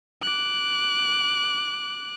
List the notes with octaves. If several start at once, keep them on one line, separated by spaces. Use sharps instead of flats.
D6 F#6